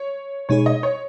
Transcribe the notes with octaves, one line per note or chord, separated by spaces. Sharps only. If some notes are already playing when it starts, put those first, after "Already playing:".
Already playing: C#5
B2 G#3 D#4 G#4 C#5
D#5
C#5